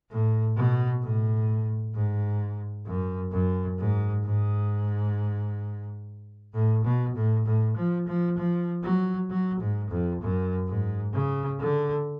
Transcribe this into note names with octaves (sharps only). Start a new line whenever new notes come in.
A2
B2
A2
G#2
F#2
F#2
G#2
G#2
A2
B2
A2
A2
F3
F3
F3
F#3
F#3
G#2
F2
F#2
G#2
C#3
D3